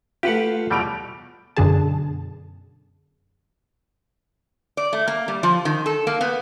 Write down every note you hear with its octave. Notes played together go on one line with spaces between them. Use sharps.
A3 F4 G4 B4 F#5
E2 B2 G3 A3 D7 F7
F#2 B2 D3 G#4 A5
D5
A3
A#3
G3
F3
D#3
A4
A#3
B3